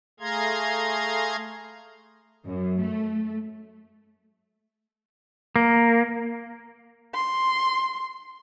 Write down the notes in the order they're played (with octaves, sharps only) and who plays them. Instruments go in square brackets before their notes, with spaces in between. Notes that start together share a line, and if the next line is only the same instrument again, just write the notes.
[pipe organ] A3 G#4 F5 A#5 C6 G#6
[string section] F#2
A3
[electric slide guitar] A#3
[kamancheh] C6